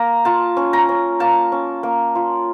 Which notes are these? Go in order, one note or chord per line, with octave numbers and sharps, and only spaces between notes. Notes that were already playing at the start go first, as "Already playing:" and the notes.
Already playing: A#3 A#5
F4 A5
C#4
A#5
C#4
A#3 A5
C#4
A#3
F4